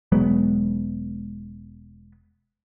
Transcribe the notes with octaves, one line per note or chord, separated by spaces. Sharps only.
E1 F#3 G#3 B3